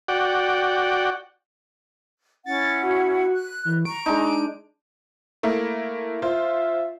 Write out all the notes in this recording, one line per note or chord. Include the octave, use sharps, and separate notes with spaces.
F#4 D5 F#5 G5
C#4 E4 F#5 A6
F#4
F#6
E3
A#5 C#6 D7
G#3 D4 D#4
A3 A#3 E4
F4 C5 E5